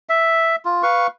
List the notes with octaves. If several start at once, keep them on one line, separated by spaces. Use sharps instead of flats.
E5
F4
B4 F5 C#6